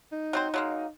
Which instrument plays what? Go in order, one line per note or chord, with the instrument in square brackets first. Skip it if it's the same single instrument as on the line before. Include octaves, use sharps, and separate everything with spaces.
[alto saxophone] D#4
[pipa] F#3 C4 C5
F#3 G#3 A#3